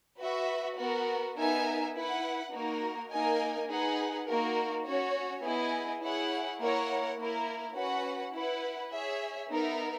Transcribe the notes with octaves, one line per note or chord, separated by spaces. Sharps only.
F#4 B4 E5
B3 F#4 A#4
B3 D#4 A#4 E5 G#5
E4 B4 F#5
A#3 D#4 F#4 A#4
A#3 D#4 A#4 D#5 G#5
D#4 G#4 B4 F#5
A#3 D#4 F#4 A#4
C#4 F#4 C#5
B3 E4 G#4 D#5 G#5
E4 G#4 C#5 F#5
A#3 E4 A#4 C#5 F#5
A#3 E4 A#4
C#4 F#4 B4 F#5
E4 B4 F#5
G#4 C#5 E5
B3 D#4 A#4 E5